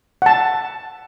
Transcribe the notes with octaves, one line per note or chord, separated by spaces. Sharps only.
F#5 A5